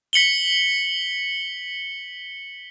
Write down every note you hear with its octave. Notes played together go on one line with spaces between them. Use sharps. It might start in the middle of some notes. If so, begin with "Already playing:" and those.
B6 C#7 F#7 G7